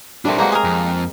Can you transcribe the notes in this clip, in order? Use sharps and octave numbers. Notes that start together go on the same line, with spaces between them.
G3 A3 C4 D4 A#4
G#3 A#3 F#4 G#4 B4 C#5 G5 A#5
G#4 A#4
F2